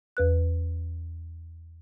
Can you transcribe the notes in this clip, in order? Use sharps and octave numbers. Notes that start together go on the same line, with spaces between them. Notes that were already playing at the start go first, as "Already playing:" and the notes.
E2 B4 F#6